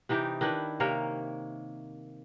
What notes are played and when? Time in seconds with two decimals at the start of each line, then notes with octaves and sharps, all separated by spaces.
0.09 C3 E3 D#4 G4
0.41 D#3 D4 E4 B4
0.80 C3 A#3 A#4 C#5